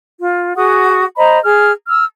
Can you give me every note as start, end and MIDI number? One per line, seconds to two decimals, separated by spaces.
0.20 0.53 65
0.55 1.04 66
0.55 1.04 68
0.55 1.04 78
0.55 1.04 87
1.17 1.39 72
1.17 1.39 75
1.17 1.39 82
1.17 1.39 83
1.43 1.72 68
1.43 1.72 89
1.87 2.04 88
1.87 2.04 89